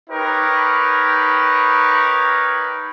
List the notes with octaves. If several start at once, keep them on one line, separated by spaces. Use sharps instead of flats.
D#4 G4 A#4 B4 C#5